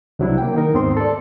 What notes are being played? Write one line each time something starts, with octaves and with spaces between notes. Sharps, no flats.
C2 C3 F#3 D4 E4
A#3 G5
D#3 D#4 A#4
D#2 G#2 B3 C4 D#4 C6
A4 D5